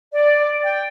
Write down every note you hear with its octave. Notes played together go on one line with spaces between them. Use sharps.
D5
G5